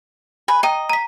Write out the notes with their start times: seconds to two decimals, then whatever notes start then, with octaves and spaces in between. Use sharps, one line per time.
0.48 B4 G#5
0.63 D#5 G5 A#5 D#7
0.89 A#5 B6